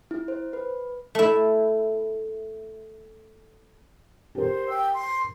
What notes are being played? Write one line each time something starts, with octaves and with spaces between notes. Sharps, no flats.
E4
C5
B4
A3 E4
G4 A#4 C5
G5 E6
C6